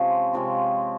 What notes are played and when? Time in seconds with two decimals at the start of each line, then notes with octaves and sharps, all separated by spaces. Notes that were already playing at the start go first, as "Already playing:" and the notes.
Already playing: C3 F3 G#3 C#4
0.33 C3 F3 G#3 C#4